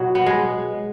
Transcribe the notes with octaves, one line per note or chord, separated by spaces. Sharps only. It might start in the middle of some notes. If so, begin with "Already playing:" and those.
Already playing: B2 F#3
B3
G#3